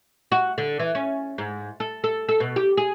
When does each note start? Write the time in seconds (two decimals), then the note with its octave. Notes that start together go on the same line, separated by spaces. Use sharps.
0.32 F#4
0.58 D3
0.79 E3
0.95 C#4
1.38 G#2
1.80 A4
2.04 A4
2.29 A4
2.40 B2
2.56 G4
2.77 G#4